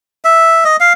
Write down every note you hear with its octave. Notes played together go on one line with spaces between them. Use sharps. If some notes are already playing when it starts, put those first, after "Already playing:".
E5
D#5
F5